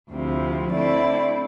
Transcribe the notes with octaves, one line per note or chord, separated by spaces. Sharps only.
D2 C3 F3 C4 E4
D3 A3 C4 E4 D5